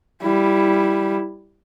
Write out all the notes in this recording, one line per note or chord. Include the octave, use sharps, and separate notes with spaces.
G3 E4